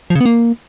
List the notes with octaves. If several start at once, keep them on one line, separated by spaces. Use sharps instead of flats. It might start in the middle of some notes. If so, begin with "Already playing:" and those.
F3
C#3
B3
A#3